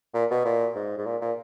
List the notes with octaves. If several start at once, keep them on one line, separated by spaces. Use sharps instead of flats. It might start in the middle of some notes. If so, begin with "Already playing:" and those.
A#2
B2
A#2
G#2
G#2
A#2
A#2